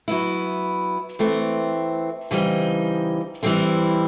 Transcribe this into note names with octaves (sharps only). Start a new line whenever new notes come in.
F#3 B3 E4
E3 A3 C4
C#3 E3 G3 C4 D#4
E3 G3 C4 E4